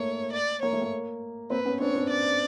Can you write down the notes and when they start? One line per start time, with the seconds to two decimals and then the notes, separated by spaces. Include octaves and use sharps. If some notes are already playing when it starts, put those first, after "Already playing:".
Already playing: A3 A#3 C#5
0.33 D5
0.62 A#3 C#5
0.73 A3
0.82 A#3
1.50 A#3 C4 B4
1.65 B3 C#4
1.80 C4 D4 C#5
1.95 C4 D4
2.10 D5